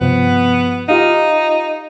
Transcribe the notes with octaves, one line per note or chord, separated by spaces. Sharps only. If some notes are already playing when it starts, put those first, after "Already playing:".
G2 C3 F3 B3
D#4 F4 G4 F5